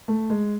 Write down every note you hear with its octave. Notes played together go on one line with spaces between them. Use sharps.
A3
G#3